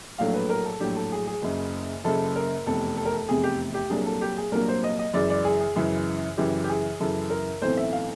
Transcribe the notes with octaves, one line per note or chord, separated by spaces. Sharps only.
A#1 A2 F#3 A3 D4 F5
B4
A#4
A4
A#1 A2 F#3 A3 D4 G4
A4
G#4
G#4
F#1 F#2 C#3
F#1 F#2 C#3 A4
A#4
F1 E2 C3 A4
A4
A#4
A4
F1 E2 C3 G#4
G4
G4
C2 A#2 F#3 A#3 D4 G#4
A4
G4
G#4
C2 A#2 F#3 A#3 D4 A#4
C5
D#5
D#5
F#2 C#3 E3 G#3 D5
D5
G#4
G#4
F#2 C#3 E3 G#3 G#4
F#2 C#3 E3 G4
G4
G#4
F#2 C#3 E3 A4
A#4
B1 A2 E3 A3 C4 C5
E5
F5